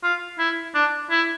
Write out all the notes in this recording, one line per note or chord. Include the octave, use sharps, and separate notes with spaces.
F4
E4
D4
E4